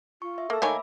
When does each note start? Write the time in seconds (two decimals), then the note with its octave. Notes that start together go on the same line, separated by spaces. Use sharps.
0.22 F4 C#6
0.38 E5
0.50 A#3 A4 E5 E6
0.62 D#3 A3 A#3 C#5 G#5 B5 D6